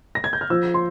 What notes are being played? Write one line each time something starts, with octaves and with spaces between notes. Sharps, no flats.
A#6
G#6
G6
F6
F3 E6
C6